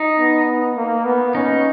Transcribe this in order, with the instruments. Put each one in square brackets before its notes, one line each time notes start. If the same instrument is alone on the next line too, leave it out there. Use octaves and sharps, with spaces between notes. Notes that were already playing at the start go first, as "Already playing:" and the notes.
Already playing: [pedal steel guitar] D#4
[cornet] B3
A#3
B3
[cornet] C#4 [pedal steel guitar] D#4